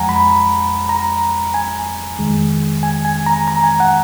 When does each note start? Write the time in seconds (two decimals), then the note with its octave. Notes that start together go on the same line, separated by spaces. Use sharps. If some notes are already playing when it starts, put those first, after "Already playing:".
Already playing: F2 F3 G#3 F#5 G#5 A#5
0.09 B5
0.89 A#5
1.54 G#5
2.19 F2 D#3 G#3
2.83 G#5
3.05 G#5
3.26 A#5
3.48 A#5
3.64 G#5
3.80 F#5